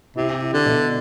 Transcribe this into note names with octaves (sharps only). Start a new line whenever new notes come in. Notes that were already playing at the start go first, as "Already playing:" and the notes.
C3 E4
E4
D3
B2